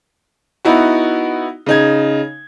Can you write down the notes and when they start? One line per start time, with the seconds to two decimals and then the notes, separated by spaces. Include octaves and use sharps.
0.65 B3 D#4 E4 F#4
1.66 C#3 D#4 G#6